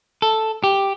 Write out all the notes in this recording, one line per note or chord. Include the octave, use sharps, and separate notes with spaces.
A4
G4